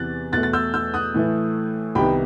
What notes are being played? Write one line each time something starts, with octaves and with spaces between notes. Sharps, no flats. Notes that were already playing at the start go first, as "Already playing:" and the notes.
Already playing: E2 C3 E3 F#6 A6
E2 B2 A3 F#6 A6
A6
E6 G6
E6 G6
D#6 F#6
A2 E3 A3 E4
C2 C3 D#3 G3 B3 G5 B5